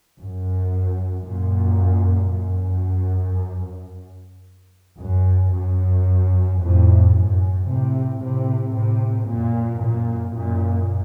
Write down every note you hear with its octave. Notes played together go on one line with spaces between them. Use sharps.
F#2
F#2 A#2
F#2
F#2
F#2
F2 A2
F#2
A2 C3
A2 C3
A2 C3
F#2 A#2
F#2 A#2
F#2 A#2